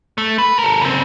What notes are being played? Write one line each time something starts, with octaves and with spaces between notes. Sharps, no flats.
A3
B4
A4 A#4
C#3 C4